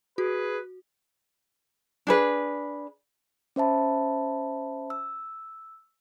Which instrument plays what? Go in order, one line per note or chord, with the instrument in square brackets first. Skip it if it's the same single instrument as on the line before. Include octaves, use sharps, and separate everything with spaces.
[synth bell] F#4 [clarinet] G#4 [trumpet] B4
[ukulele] D4 G#4 B4
[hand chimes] C#4 C5 E5 A5 B5
E6